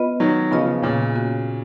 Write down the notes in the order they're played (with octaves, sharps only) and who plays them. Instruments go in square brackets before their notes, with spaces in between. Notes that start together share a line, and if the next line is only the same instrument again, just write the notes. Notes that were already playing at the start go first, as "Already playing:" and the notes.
Already playing: [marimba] B3 F4 B4 D#5
[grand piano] D#3 F#3
[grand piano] C#3 F3 [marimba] B3 F4 B4 D#5
[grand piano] A#2 C#3
[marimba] A#3 C#4 F#4 C#5